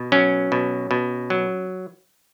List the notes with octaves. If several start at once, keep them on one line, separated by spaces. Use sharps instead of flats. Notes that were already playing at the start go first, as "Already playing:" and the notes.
Already playing: B2
F#3 C#4
B2
B2
F#3